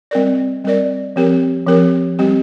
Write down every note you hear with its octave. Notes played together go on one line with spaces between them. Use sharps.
G3 C4 A#4 D5
G3 C4 A#4 D5
F3 C4 G4 A#4
F3 C4 G4 A#4
G3 C4 G4